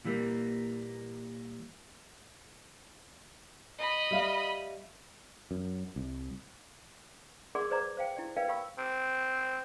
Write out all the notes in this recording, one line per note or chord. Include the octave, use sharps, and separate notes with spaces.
A#2 E3 G3 A#3
D#5 B5
G3 E5 F5
F#2
C2
G#4 A#4 D5 F#5 C6 D6
G#4 B4 C5 D5 A#5 D6
C5 F5 G5
E4 G4 D5
A#4 B4 D5 F5 G5
G4 F5 G5 B5 C#6 E6
C4